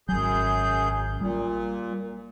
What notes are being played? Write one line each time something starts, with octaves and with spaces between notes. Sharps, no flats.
G#1 F#2 F#3 G#4 G6
A#2 G3